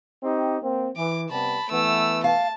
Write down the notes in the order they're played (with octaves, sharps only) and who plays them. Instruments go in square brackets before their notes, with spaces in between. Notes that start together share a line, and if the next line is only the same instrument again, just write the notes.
[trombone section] C4 D#4 G4
A#3 C4
[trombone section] E3 [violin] D6
[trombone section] C3 G3 B3 [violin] A5 B5
[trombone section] E3 B3 [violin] A3 E6
[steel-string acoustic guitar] F5 [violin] A5